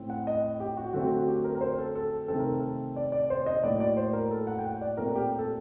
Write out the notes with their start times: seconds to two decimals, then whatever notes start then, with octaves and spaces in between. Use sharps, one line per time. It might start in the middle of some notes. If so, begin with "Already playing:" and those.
Already playing: A2 A3 C4
0.10 F#5
0.27 D#5
0.60 G4
0.77 F#4
0.93 D3 F#3 A3 C4 F#4
1.11 F#4
1.28 G4
1.44 A#4
1.55 A#4
1.61 C5
1.78 A4
1.95 A4
2.28 C3 D#3 A3 C4 A4
2.39 A#4
2.49 A4
2.96 D5
3.12 D5
3.30 C5
3.46 D#5
3.63 A2 F#3 A#3 D5
3.80 D5
3.97 C5
4.13 A#4
4.31 A4
4.47 F#5
4.59 G5
4.64 F#5
4.81 D5
4.97 A#2 A3 C4 A#4
5.15 G4
5.39 A4